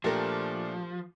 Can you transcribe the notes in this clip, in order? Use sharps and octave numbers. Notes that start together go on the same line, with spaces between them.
A#2 F3 A3 D4 G4 A#4